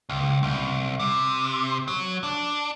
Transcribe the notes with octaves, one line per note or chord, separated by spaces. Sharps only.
C#2
C2
C3
F#3
D4